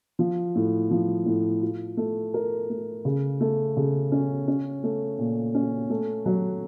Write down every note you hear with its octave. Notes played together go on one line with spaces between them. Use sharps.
F3
A2
F3
A2
F4
A3
A#4
A3
C#3
A3
C#3
C#4
C#4
A3
A#2
C#4
A3
F#3